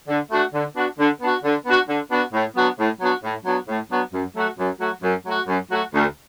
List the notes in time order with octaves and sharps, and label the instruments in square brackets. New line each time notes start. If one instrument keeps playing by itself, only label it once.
[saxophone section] D3
A3 D4 F#4
D3
B3 D4 F#4
D3
B3 D4 F#4
D3
B3 D4 F#4
D3
B3 D4 F#4
A2
F#3 B3 D4 F#4
A2
F#3 B3 D4 F#4
A2
F#3 B3 D4 F#4
A2
F#3 B3 D4 F#4
F#2
F#3 A3 F#4
F#2
F#3 A3 F#4
F#2
F#3 A3 F#4
F#2
F#3 A3 F#4
D2